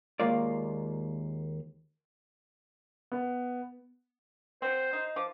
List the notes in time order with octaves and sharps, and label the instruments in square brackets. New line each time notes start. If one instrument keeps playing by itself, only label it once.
[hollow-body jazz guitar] D#2 G#3 A#3 F4 A#4 D5
[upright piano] B3
[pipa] F#3 C4 [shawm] C5
[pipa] D#4
[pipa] F3 [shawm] D6